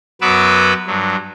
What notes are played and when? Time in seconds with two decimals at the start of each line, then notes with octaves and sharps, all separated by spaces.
0.21 F#2 F#3 B3 B4 D6 E6
0.87 G2 F#3